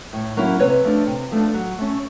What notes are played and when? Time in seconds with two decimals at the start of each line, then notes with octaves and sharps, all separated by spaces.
0.13 A2
0.37 F#3 A#3 C#4 E4
0.60 C3 B4 C#5
0.83 F3 A3 D4
1.07 C3
1.31 F3 A3 D4
1.54 F#3
1.78 A3 C#4